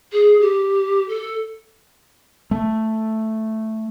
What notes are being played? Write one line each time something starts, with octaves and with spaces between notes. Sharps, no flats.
G#4
G4
A4
A3